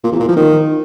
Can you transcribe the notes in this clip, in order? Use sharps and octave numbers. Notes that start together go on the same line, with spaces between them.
A#2
E2
A#2
F3
D#3